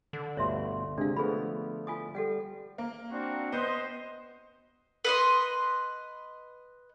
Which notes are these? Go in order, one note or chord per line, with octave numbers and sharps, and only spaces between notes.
D3
G1 D2 B2 C#5 E5 C6
C3 G#3 D4 F5
F3 A3 B3 G#4 B5
F4 G#5 D#6
G3 A4 F#5 G5
A#3
C4 D4 F#4
B3 C5 D#5
B4 D#5 C6